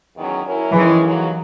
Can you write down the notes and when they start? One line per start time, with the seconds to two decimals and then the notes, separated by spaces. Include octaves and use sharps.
0.17 E2 D#3 F#3 C#4
0.45 F#3 C#4 E4 A#4
0.74 D#3 E3 G#3 C#4 G#4
1.02 D#2 C#3 F#3